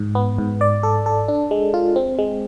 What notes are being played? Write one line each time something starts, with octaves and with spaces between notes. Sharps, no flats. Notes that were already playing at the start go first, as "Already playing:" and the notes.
Already playing: G#2
B3
G#2
D5
A4
A4
D4
G#3
F4
C4
G#3